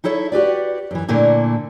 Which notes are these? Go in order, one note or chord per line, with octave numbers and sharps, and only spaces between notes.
D#4 E4 A4 C#5 E5
F#4 G4 B4 D5
F#2 E3
A#2 D3 A3 A#3 E4